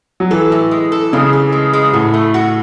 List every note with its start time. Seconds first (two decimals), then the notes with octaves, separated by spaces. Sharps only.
0.20 F#3
0.31 E3 A4
0.52 A2
0.71 G#3
0.92 A4
1.13 C#3 G#3
1.33 A4
1.52 G#3
1.73 G#3
1.93 A2 F#4
2.14 A3
2.34 F#4